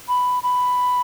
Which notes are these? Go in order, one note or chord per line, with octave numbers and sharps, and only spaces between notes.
B5
B5